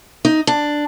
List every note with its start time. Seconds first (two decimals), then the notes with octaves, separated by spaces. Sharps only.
0.25 D#4
0.47 D4